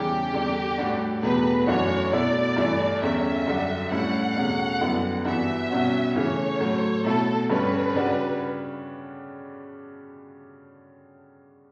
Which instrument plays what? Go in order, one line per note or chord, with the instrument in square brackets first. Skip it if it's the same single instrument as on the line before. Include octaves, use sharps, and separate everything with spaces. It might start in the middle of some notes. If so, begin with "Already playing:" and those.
Already playing: [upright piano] E2 C#3 E3 G3 [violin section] G4
[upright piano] E2 D3 G3 D4
A2 G3 D4 F#4
[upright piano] E2 B2 A3 [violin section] B4
[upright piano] F#2 E3 A3 D4 F#4 [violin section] C#5
[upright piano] B2 A3 E4 [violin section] D5
[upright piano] G2 E3 A3 E4
[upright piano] E2 D3 G3 C#4 [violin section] E5
[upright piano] F#2 D3 G3 D4 F#4
[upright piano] A2 G3 C#4 E4 [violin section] F#5
[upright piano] E2 B2 A3 C#4
F#2 D3 G3 B3 E4
[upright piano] G2 E3 B3 D4 F#4 [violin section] E5
[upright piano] B2 G3 C#4 F#4
[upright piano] C#3 E3 A3 [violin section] C#5
[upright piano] A2 F#3 A3
[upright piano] B2 A3 E4 [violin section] A4
[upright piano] G2 D3 G3 C#4 [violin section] B4
[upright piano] C#3 G3 D4 F#4